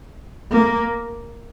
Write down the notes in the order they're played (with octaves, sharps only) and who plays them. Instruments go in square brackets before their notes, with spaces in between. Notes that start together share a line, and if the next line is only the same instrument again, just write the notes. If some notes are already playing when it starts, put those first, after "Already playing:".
[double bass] A#3